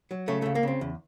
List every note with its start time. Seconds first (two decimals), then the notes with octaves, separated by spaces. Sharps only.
0.11 F#3
0.28 C#3 A3
0.42 C#2 A3
0.55 A#3
0.63 C#3 C4
0.81 E2